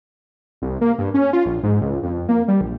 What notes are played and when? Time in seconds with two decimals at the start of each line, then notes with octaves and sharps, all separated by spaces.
0.62 C2
0.81 A#3
0.99 G2
1.14 C#4
1.33 F4
1.45 A#1
1.63 G#2
1.81 C#2
2.03 F2
2.29 A#3
2.48 G3
2.61 A#1